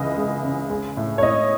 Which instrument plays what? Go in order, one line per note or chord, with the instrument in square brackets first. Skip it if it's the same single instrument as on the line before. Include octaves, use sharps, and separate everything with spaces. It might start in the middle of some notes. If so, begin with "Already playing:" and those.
Already playing: [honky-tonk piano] C#2 E3 D#5
G#3
C#3
G#3
A2
C#5
A2 D#5